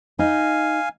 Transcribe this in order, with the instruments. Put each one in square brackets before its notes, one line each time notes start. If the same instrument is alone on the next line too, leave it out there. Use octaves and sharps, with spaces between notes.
[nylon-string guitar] D#4 [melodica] F5 G#5